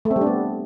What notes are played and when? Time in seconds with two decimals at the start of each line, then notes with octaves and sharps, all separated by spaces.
0.05 A3
0.11 C4
0.16 G3
0.21 D4
0.27 B3